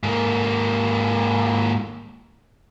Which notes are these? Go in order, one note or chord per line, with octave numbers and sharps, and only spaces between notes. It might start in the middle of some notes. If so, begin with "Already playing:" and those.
G#2 A#3